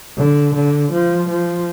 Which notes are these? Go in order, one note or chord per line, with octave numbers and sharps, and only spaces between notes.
D3
D3
F3
F3